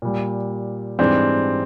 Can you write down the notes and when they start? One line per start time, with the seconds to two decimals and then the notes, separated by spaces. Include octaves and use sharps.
0.02 A#2 G3
0.99 G#2 E3 G3 C4 D4